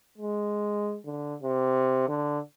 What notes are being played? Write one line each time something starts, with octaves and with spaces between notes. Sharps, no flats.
G#3
D3
C3
D3